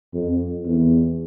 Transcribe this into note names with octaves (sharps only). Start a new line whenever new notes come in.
F2
E2